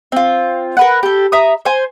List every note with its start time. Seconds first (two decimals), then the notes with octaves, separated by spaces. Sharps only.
0.12 C4 F4
0.77 A#4 B4 F#5
1.03 G4 A4
1.32 E5 A#5 D#6
1.65 C5 G#5